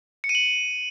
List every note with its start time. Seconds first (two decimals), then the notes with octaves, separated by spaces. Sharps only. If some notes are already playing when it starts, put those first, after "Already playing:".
0.24 C#7
0.29 D#7
0.35 F#7